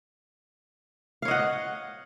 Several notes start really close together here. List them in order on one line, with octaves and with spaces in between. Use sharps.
F5 C#5 D#5 F#5